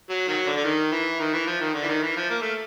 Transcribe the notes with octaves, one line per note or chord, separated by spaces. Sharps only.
F#3
D#3 F#3
D3
D3
D#3
E3
D#3
E3
F3
D#3
D3
E3
D#3
E3
F3
A#3
A3